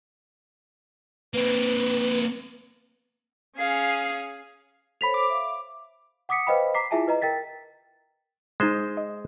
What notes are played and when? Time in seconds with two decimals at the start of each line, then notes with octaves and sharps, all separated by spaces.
1.34 A#3 C4 B4
3.56 C#4 G#4 F5
5.01 A4 C5 C#5 B5 B6 F7
5.14 D6
5.30 E5 F5
6.29 F#5 D6 D#6 B6 C#7
6.47 B4 C5 D#5 F5 G5 B5
6.74 A#5 D6 B6 C7
6.91 E4 F4 G#4 E5 G#5 A5
7.08 B4 D#5 A#5
7.22 A#4 G5 A6 B6
8.60 G#3 D#4 C5 A6 D#7
8.97 D#5